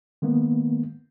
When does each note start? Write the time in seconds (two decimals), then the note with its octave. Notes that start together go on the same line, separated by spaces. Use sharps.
0.22 D#3 G#3 A#3 B3